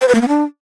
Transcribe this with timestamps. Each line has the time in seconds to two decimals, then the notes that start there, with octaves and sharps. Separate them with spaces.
0.01 C5
0.08 B4
0.15 A#3
0.21 B3
0.28 D4